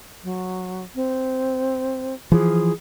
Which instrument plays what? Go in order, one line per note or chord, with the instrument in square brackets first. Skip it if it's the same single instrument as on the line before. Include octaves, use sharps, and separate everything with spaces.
[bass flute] F#3
C4
[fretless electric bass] E3 F3 [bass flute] G#4